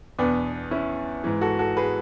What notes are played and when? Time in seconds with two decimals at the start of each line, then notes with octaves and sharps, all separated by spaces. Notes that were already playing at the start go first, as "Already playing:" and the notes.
0.19 E2 B2 B3 D4
0.71 C#4 E4
1.24 G#2 E3
1.41 F#4 A4
1.59 F#4 A4
1.77 G#4 B4